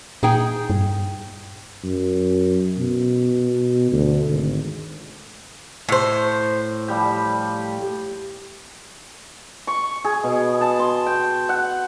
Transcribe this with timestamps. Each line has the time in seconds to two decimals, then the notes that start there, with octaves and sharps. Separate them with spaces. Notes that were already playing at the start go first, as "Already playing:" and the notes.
0.23 A#2 D#4 G#4 G5
0.70 G2
1.84 F#2
2.77 B2
3.92 D2
4.29 G#1
5.89 A2 C5
6.88 F3 G3 G4
9.67 C#6
10.04 G#4
10.24 B2
10.61 A5
10.79 C6
11.06 G5
11.49 F#5